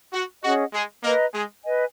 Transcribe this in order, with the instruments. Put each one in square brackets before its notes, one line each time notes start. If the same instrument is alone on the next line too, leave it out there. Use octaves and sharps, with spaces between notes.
[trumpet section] F#4
[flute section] C#4 G#4 D#5 F#5 [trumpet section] F#4
[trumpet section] G#3 G#4
[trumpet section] A#3 A#4 [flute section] B4 D#5 A#5
[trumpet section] G#3 G#4
[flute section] B4 D#5 G#5